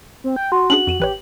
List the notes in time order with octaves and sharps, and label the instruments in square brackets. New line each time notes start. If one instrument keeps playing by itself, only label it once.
[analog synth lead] C4
G5
[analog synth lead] F#4 [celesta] C6
[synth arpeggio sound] C#4 D4 G#4 [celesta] F#7
[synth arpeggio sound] F2 D#7 E7
[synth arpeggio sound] A1 B4 C#5 [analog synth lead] G4